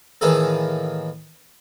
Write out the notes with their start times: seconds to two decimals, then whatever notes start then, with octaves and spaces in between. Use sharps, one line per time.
0.21 A2 D#3 E3 A#3 G#4 A4